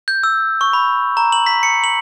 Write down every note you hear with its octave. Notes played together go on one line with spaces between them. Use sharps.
G6
E6
C#6
B5
A#5
F#7
B6
C#7
F#7